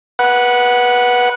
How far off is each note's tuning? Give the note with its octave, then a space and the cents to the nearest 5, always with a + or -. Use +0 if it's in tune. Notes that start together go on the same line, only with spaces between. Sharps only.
B4 -20 F#5 +0